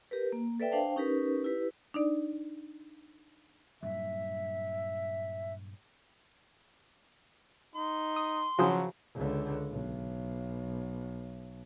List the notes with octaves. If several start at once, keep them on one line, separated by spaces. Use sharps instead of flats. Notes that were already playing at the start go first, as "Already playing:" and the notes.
G4 A#4 B4
A#3
A4 B4 D5 E5 G5
D4 C5 F5 G5 A5
C#4 D#4 G4 A#4 B4
E4 G4 B4
D4 D#4 D5
G2 A#2 F#3 E5
D#4 C6
D#6
C#3 F3 F#3 F#4 G#4 C5 D#6
C#2 D3
B1